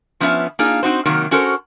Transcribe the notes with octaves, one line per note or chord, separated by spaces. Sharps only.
F3 B3 C#4 D4 E5
A#3 D4 D#4 F4 G#4
C4 D#4 F#4 C5
C3 D#3 F#3 A#3
C#4 F#4 A4 A#4 C5